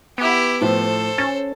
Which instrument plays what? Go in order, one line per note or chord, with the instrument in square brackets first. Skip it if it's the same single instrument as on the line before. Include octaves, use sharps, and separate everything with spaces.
[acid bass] B3 [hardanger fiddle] E4 G4
[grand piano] A2 F3 [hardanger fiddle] A4 C5
[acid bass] C#4 [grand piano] A6